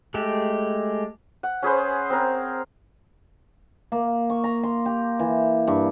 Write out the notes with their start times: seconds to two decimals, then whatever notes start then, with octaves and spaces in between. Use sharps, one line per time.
0.14 G#3 A3 G4
1.43 F#5
1.63 C#4 G#4 B4 C5
2.10 C4 A#4
3.92 A#3
4.30 C#6
4.44 A#5
4.63 C6
4.86 G4
5.19 E3
5.67 G2